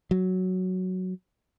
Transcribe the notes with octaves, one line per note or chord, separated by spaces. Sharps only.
F#3